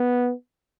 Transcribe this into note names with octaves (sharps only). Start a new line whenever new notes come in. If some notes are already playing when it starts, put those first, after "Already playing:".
Already playing: B3